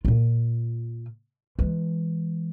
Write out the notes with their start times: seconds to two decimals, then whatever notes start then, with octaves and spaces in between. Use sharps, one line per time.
0.05 A#2 F4
1.59 E3 G#3